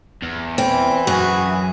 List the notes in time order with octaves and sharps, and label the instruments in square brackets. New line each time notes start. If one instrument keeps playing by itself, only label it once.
[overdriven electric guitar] E2
[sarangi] E3 [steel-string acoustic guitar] C4
[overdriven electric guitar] F#2 [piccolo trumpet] F#4 [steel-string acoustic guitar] G#4